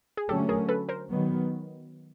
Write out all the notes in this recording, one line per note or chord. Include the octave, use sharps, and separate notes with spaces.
G#4
D3 F#3 A3 C#4 G4 A4
G#4 A#4
A4 B4
A#4 C5
D#3 F#3 B3